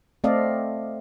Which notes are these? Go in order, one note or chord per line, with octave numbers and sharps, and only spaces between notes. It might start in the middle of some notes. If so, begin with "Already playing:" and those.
A3 C4 A4 D5 D#5 F5